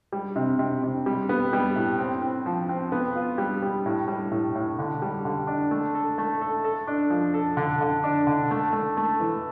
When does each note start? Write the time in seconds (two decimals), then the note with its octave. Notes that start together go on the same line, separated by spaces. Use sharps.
0.12 G3
0.36 C3
0.59 C3
0.83 C3
1.06 G3
1.29 B3
1.53 G3
1.76 A2
1.99 C4
2.22 C4
2.46 F3
2.69 C4
2.92 B3
3.15 F4
3.38 G3
3.62 G3
3.86 A2
4.08 G3
4.31 A2
4.55 A2
4.79 D3
5.02 G3
5.25 D3
5.47 D4
5.71 A3
5.95 A4
6.18 A3
6.41 A4
6.64 A4
6.87 D4
7.10 F3
7.34 A4
7.57 D3
7.81 D3
8.04 D4
8.27 D3
8.51 A3
8.73 A3
8.97 A3
9.20 E3